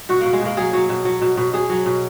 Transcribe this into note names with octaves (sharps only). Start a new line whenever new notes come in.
B2 F#4
B2 A#3
G#3
B2 A#3
F#3 G#4
F#3
B2
F#3
B2
B2
B2 G#4
F#3
B2